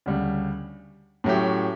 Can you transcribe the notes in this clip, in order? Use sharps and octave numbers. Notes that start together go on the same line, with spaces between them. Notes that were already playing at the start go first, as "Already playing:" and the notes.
D2 C#3 G3
A2 F#3 A3 C#4 G4